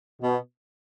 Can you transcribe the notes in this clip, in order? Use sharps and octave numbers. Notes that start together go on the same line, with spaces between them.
B2